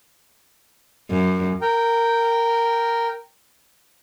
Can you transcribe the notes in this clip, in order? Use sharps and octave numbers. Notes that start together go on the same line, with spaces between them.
F#2
A#4 G5